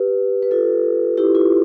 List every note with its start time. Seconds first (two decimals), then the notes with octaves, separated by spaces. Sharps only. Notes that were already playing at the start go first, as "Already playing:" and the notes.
Already playing: G4 B4
0.42 B4
0.51 F4 A4
1.17 E4 G4
1.35 F4